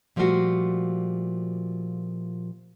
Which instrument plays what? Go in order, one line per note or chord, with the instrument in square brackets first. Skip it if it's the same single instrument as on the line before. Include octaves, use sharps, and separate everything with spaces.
[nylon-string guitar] A#2 F3 G3 A3 F4 F#4